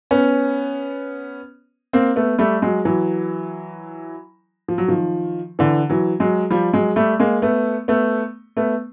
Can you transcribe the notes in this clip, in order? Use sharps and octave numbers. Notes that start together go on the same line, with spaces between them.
B3 C#4
A#3 C4
A3 B3
G3 A3
F#3 G#3
E3 F#3
F3
F#3
D#3 F3
D3 E3
E3 F#3
F#3 G#3
F3 G3
F#3 G#3
G3 A3
G#3 A#3
A3 B3
A3 B3
A3 B3